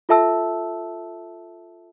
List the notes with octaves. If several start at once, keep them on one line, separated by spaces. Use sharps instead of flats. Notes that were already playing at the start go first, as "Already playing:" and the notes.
F4 A4 E5 A5 E6